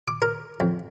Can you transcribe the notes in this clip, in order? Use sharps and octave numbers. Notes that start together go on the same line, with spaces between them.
D6
A#4
F2